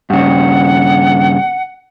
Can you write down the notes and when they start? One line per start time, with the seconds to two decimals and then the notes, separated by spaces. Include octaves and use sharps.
0.10 G2 C#3 F#5